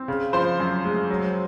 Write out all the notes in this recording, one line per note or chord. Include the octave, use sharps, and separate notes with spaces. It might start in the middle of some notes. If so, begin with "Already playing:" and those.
Already playing: C4
C#3
F3 C5 C6
F#2
G#3
F#3